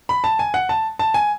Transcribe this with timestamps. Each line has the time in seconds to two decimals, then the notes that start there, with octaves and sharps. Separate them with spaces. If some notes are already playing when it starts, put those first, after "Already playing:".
0.09 B5
0.24 A5
0.39 G#5
0.54 F#5
0.69 A5
0.99 A5
1.14 G#5